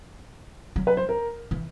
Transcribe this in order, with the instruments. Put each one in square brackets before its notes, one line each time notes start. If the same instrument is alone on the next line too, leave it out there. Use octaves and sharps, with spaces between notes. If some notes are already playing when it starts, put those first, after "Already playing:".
[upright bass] F#3
[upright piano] B4
C5
A#4
[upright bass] E3